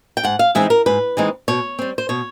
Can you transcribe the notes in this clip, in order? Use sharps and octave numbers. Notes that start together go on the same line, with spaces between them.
G5
G#2 F#5
F5
E3 G#3 C4 D#4 E5
A#4
G#2 B4
E3 G#3 C4 D#4
B2 C#5
G3 C4
C5
B2 C#5